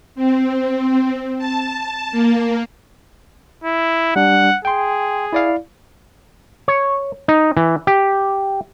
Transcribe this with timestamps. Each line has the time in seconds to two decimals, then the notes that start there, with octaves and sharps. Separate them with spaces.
0.15 C4
1.38 A5
2.11 A#3
3.64 E4
4.16 G3 D4 F#5
4.65 G#4 G5 C6
5.33 E4 D5 F5
6.68 C#5
7.28 D#4
7.57 E3
7.87 G4